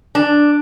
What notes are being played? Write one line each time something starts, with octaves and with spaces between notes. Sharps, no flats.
D4